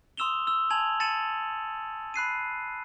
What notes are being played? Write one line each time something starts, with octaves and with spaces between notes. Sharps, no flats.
C6 D#6 E6 E7 F7 G7
E6 G7
G#5 A5 G#6 F7 F#7
A5 A6 C#7 D#7 E7 F#7
B5 F#6 C7 D#7